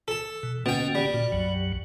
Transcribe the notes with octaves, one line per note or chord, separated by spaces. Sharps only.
A4 A5
B2
B2 D3 A#3 C#4 G5
G3
A#2 F#4
B1 F#2 F#3